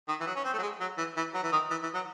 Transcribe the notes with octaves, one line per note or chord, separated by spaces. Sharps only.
D#3
E3
F#3
C#4
C4
A3
F#3
G#3
F#3
E3
E3
F#3
E3
D#3
E3
E3
F#3